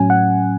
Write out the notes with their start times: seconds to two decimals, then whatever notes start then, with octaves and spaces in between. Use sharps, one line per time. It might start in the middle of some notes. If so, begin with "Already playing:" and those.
Already playing: A2 F#3 C#4 G#5
0.10 F#5